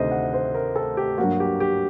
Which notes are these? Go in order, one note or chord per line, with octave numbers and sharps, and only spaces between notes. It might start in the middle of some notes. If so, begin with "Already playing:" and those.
Already playing: D2 C3 D#3 A3 C5 D#5
F#5
C5
A#4
A4
G4
G2 F#3 A#3 F#4
G4
G4